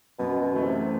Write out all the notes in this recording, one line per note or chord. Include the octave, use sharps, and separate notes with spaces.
F#2 B2
B2
E3 A3
C3